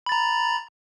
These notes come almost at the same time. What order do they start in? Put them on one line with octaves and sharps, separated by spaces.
B5 A6 A#5